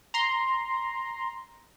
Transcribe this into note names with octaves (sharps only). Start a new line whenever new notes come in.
A#5 C6